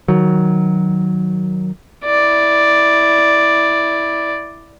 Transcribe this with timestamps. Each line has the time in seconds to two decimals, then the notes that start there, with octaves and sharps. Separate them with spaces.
0.08 D#3 F#3
2.05 E4 D5